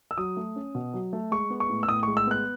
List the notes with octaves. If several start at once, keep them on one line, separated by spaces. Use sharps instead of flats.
E6
F#3 D#6
A3
C#4
B2
F#3
A3
G#3 C#6
B3
C#6
A2
E6
A2 D#6
G#3 C#6
E6
B3 F#6